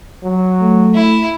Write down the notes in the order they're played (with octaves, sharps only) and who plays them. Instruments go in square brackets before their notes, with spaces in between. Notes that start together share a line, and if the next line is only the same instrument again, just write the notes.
[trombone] F#3
[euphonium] A3
[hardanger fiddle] E4